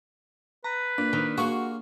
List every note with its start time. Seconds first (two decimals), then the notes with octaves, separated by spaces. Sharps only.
0.64 B4 A#5
0.98 A#2 D4
1.13 D#3
1.38 A#3 F4 F#4 G#4